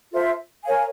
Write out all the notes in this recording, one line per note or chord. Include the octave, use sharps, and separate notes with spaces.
F4 A4 C5 E5
A#4 C#5 F5 G#5